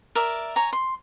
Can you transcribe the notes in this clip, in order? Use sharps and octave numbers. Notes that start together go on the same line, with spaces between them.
A#4 D5 E5
C#5 G#5 A#5
C6